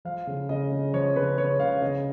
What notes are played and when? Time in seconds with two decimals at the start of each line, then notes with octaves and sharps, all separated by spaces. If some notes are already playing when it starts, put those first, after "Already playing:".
0.05 F3 F5
0.27 C#3
0.49 C#3 D#5
0.71 C#3
0.93 F3 C#5
1.16 C#3 B4
1.38 C#3 C#5
1.60 C#3 F5
1.82 C#3 D#5